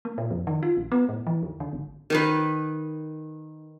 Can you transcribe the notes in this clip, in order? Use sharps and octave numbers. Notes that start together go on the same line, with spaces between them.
A#3
A#2
F2
D#3
F4
A#1
B3
A2
E3
D#2
D3
G#1
D#3 D#4 B4